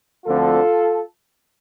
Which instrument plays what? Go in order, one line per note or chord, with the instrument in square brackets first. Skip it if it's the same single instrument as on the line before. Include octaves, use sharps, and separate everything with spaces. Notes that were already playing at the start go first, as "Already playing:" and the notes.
[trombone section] D2 D3 F3 C4 F4 A4